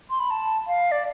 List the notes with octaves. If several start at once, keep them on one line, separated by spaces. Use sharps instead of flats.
C6
B5
A5
F5
D5